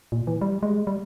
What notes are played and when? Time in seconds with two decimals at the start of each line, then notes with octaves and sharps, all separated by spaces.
0.12 A#2
0.27 E3
0.41 G3
0.63 G#3
0.87 G3